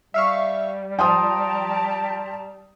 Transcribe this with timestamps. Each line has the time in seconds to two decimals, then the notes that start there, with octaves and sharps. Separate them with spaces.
0.14 G3 E5 F5 C#6
0.99 F3 G4 G5 A5 A#5 C6 D#6